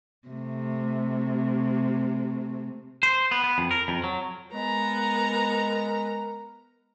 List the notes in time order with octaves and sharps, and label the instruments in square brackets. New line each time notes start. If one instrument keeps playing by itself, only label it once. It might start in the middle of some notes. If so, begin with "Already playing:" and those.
[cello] C3 A3
[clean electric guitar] C5
B3
B3
F2
A#4
F2
F#3
[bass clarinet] G#3 [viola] B3 A#5 [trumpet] A#4